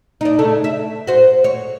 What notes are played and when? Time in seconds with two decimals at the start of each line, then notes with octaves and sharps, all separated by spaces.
0.21 D4 D#4
0.39 C#3 A3 D4
0.64 E5
1.07 F#4 C5
1.44 C#5